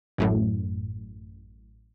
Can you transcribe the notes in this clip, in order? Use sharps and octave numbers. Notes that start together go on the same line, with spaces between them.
A1 F#2 A2